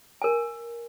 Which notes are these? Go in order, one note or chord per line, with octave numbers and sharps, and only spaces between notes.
A#4 G#5